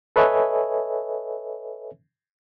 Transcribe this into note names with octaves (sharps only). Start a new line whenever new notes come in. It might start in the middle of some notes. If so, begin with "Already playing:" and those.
A4 B4 C#5 D#5 E5 G#5